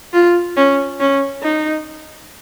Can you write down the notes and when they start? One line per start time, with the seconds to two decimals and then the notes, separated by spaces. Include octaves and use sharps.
0.14 F4
0.57 C#4
1.00 C#4
1.43 D#4